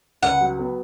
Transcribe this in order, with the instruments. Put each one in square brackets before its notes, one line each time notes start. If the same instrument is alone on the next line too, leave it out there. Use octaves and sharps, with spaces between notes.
[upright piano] C#2 [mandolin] F#5
[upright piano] F#3
B3